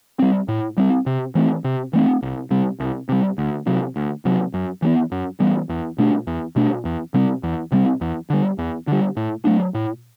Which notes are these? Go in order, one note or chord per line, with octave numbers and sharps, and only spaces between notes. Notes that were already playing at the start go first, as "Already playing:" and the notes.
G3 C4
A2
G3 C4
C3
E3 A3 C4
C3
E3 A3 C4
C2
C3 G3
C2
C3 G3
D2
C3 F#3
D2
C3 F#3
F#2
E3 G3 B3
F#2
E3 G3 B3
E2
B2 A3 D4
E2
B2 A3 D4
E2
C3 G3 C4
E2
C3 G3 C4
E2
D3 G3
E2
D3 G3
A2
F#3 A3 D4
A2